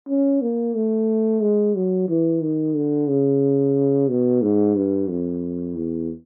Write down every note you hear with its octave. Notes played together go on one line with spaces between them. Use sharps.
C#4
A#3
A3
G#3
F#3
E3
D#3
D3
C#3
B2
G#2
G2
F2
E2